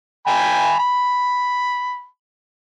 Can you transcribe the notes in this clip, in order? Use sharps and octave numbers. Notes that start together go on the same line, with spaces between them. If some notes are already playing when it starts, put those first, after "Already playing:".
G5 G#5 B5
B5